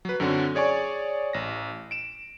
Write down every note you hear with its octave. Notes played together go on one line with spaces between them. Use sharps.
F#3 B4
F#2 D3 C4 C#4 F#4
G#4 C#5 D5 G#5 C#6
A1 A#6
D7 E7